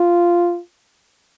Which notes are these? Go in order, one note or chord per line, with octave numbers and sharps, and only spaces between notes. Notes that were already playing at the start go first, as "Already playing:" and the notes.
Already playing: F4